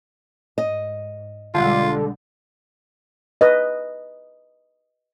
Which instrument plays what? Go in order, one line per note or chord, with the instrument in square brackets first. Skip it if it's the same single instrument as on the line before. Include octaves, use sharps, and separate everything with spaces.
[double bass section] G#2 [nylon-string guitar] D#5
[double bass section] B1 G3 G#3 [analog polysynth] D3 [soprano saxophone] F4
[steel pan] B4 D#5